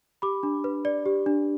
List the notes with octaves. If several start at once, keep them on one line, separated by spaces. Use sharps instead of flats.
G4 B5 D6
D4
B4
D5
G4
D4